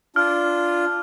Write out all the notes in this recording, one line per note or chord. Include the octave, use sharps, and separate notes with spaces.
D4 F4 F6